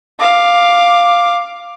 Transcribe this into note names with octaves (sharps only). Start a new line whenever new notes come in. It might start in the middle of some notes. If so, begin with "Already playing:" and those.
F5 D6